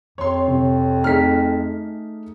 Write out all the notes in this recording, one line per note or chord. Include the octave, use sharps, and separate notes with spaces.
F2 C#5 C6
C3
A3 D#4 G#4 F6 B6